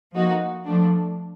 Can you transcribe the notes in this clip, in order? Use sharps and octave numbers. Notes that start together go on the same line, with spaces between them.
F3 A#3 D#4 F#4
F3 A3 D4